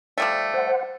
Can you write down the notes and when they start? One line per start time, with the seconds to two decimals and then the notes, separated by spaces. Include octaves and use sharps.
0.18 F3 G3 A3
0.54 C5 F#5